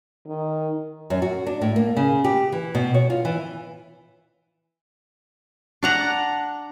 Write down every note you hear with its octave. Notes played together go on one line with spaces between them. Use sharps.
D#3
F#2
F#4
D4
A2
A#3
C#3
G4
E3
B2
C#5
F4
E3
D4 F#5 A#5